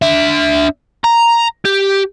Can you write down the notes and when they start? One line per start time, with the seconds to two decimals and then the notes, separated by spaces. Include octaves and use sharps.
0.02 D4 E5
1.04 A#5
1.65 G4